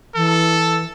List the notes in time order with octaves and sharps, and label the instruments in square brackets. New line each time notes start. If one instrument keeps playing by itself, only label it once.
[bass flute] E3 [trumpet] A4